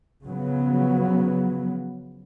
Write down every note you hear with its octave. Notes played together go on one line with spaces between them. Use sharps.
C#3 F3 F#3 B3